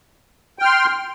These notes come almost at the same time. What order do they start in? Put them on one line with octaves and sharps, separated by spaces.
G5 F6 C6